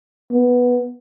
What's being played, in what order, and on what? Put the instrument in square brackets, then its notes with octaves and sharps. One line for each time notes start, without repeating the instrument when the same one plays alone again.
[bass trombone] B3